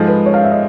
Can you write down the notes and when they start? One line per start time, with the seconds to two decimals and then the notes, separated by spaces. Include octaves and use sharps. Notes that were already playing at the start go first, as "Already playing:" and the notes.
Already playing: G#2 F3 G#3 A4
0.08 B4
0.26 C#5
0.34 F5
0.44 E5
0.52 D#5